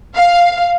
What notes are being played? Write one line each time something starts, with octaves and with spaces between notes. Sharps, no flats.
F5